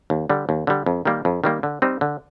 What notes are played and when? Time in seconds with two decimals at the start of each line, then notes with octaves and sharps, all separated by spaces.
0.10 D#2
0.29 D3 G3
0.49 D#2
0.67 D3 G3
0.86 F2
1.05 D#3 G3 A#3
1.25 F2
1.44 D#3 G3 A#3
1.63 D3
1.82 G3 C4 D#4
2.01 D3